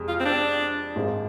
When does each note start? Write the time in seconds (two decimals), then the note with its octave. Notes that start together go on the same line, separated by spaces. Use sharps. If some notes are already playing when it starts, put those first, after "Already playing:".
Already playing: F2 C3 G#3
0.08 F4
0.20 C4
0.25 D4
0.96 G#1 G#2 G#3 C4 F4